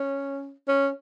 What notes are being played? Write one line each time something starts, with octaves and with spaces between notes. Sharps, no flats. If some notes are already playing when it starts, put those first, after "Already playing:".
Already playing: C#4
C#4